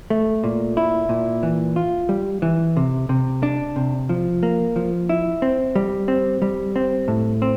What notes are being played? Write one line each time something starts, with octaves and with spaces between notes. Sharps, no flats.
A3
A#2
E4
A#2
E3
F4
G3
E3
C3
C3
D4
C3
F3
A#3
F3
E4
C4
G3
C4
G3
C4
A2
C4